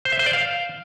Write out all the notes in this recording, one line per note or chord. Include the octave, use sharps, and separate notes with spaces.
C5
E5
C5
D5
F5